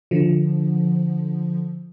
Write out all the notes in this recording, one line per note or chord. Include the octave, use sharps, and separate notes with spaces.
D3 F3